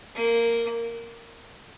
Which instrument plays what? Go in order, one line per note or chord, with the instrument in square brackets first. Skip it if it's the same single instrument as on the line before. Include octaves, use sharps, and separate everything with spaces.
[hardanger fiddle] A#3